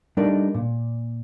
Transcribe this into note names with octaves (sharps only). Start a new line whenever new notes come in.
G3 A3 D4 D#4 A#4 D5
A#2